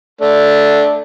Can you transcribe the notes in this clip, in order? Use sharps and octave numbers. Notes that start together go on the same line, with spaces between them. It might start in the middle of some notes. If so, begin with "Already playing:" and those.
A3 D4